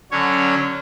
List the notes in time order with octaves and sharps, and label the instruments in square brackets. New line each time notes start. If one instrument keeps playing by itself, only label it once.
[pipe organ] D3 F#3 C#4 C#5